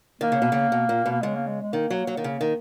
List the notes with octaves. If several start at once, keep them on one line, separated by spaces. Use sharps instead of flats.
D#3 A#3
C#3
B2
C#3
B2
A#2
B2
A#3
C#3 G#3
A#3
G#3
G#3
D#3 A#3
F#3
F#3
D#3
C#3
D#3